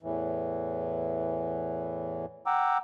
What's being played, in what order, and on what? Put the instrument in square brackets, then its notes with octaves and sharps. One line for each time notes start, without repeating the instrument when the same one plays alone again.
[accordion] E2 A2 E3
F#5 G5 A#5 D6 E6